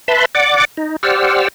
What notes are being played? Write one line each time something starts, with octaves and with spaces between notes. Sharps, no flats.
B4 E5 A5 B5 C6
D5 F#5 D6
D#4
G4 C5 D5 F#5 E6 F6